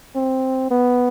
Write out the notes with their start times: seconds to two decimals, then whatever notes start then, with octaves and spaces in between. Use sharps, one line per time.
0.15 C4
0.71 B3